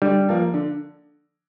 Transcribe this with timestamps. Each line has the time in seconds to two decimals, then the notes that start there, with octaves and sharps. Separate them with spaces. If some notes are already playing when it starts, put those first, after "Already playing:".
0.02 D3 G3
0.29 F3 A#3
0.54 D3